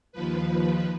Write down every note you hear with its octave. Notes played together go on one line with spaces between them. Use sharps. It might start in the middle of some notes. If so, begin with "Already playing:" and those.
D#2 F3 B4